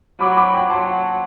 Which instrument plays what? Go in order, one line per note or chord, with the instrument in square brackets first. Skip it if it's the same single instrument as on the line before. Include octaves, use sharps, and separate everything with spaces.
[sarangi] F#3 [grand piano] B5 D6
[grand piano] B5 D6
G5 B5
[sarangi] F#3 [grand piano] A5 C6